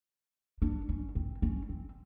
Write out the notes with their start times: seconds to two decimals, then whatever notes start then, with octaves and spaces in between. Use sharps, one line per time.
0.62 D4
0.89 C#4
1.15 C4
1.42 C#4
1.69 C4